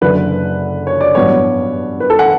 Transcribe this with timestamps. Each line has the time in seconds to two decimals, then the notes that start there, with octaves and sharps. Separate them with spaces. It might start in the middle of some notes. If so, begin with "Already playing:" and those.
0.01 F#1 F#2 D3 F#3 B4
0.87 C#5
1.01 D5
1.15 A1 G2 F#3 B3 C#5
2.00 B4
2.10 A4
2.19 F#5